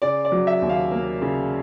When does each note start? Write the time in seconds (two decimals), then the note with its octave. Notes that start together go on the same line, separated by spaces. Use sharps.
0.02 C#3 D5
0.25 D5
0.32 F#3
0.47 E5
0.62 D#2
0.69 F5
0.92 A#3
1.22 C#3